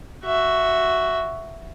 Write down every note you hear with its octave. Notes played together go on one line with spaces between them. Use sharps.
F#4 E5